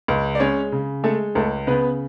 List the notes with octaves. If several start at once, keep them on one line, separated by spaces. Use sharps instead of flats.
C#2
D5
G#3 C#4 C#5
C#3
G#3 A3 A4
C#2 A3 A4
C#3 B3 B4